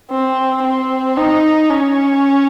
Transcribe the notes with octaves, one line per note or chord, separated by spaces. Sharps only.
C4
C4
D#4
C#4